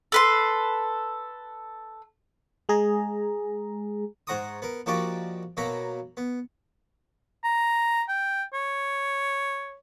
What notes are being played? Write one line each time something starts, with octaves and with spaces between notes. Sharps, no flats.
A4 B4 C6
G#3 G#4 A#5
G#2 C5 F#5 A#5 C#6 D#6
B3 A#4
F3 A#3 D#4 F#4 G4 D5
B2 F#3 A#3 A#5 B5
B3
A#5
G5
C#5